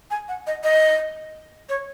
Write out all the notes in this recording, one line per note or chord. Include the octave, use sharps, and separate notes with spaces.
G#5
F#5
D#5
D#5
C#5